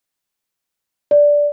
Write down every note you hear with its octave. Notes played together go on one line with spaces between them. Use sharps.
D5